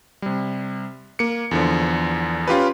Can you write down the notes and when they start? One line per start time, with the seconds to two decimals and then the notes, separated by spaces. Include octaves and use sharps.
0.22 C3 G3
1.19 A#3 C#7
1.51 E2 D3 F3
2.47 C#4 F4 G4 B4